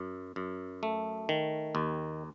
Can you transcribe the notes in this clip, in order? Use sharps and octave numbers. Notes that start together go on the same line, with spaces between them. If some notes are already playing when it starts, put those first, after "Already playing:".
Already playing: F#2
F#2
A3
D#3
D#2